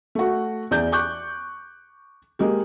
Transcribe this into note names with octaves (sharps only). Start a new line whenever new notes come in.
A3 F#4
E2 D5 G6
C#6 D6 F#6 G6
G#3 A#3 G4